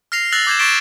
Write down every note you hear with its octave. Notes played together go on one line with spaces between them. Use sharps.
F6 A#6 C7 F7
E6 F#6 A6 A#6 F7 F#7
D6 G6 G#6 C7 E7
C#6 A6 B6 D7 E7 G7